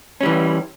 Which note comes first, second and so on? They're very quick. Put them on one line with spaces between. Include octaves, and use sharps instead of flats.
C#4 G3 E3